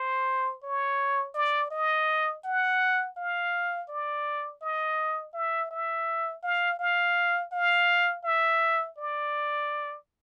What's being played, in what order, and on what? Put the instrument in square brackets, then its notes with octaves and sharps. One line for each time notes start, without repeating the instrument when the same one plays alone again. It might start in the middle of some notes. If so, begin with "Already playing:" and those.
Already playing: [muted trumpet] C5
C#5
D5
D#5
F#5
F5
D5
D#5
E5
E5
F5
F5
F5
E5
D5